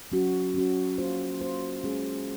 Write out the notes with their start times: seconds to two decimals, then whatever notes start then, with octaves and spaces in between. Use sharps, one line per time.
0.12 F#3 C#4 F#4
0.54 F#3 C#4 F#4
0.98 A#3 F4 C5
1.41 A#3 F4 C5
1.84 G#3 C#4 G#4